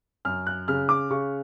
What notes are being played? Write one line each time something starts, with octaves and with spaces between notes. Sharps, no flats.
F#2 F6
F#6
C#3 F6
D6
C#3 C#6